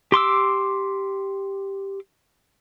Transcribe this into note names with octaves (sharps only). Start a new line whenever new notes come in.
G4 C6 D6 E6